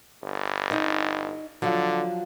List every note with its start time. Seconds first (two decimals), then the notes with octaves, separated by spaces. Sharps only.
0.23 G1
0.71 D#4 D#5
1.62 D3 F3 F#3